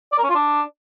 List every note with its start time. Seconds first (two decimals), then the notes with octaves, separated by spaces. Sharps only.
0.12 D5
0.18 A#4
0.24 C#4
0.29 F4
0.35 D4